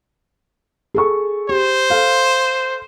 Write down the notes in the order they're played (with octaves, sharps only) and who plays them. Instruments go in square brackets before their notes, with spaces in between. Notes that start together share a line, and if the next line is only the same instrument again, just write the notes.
[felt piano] G#4 A4 C#6
[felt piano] G4 [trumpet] C5
[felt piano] A4 F5